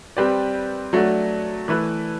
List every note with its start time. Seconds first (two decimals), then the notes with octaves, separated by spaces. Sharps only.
0.17 G3 C4 G4 B4 D5
0.93 F#3 A3 D4 F#4
1.68 E3 A3 E4 B4